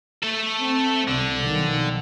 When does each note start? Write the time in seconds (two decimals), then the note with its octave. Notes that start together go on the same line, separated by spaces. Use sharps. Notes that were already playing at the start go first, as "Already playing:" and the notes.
0.23 A3 A4
0.60 C4
1.08 C2 D3
1.41 B1 D#3 F3